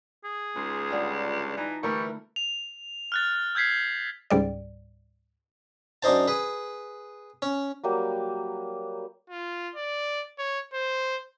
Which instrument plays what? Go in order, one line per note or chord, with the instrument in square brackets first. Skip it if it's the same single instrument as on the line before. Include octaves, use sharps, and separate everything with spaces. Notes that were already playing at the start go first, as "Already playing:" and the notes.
[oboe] G#4
[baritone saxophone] C#2 [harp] G#2 C6
[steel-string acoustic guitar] G2 D3 [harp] D#4 F4
[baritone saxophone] E3 [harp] D#4 A5 A#5
[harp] D3 A3 [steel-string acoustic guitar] E3 A#4 B4 [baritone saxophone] G3 [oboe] C#6
[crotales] F7
F6 F#6 A6
E6 G6 G#6 B6 C7
[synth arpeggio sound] C#2 G#2 G3 D5
[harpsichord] F#2 D4 D#4 C5 A5
G#4 B4
C#4
[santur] F#3 G3 A#3 G5
[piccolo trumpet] F4
D5
C#5
C5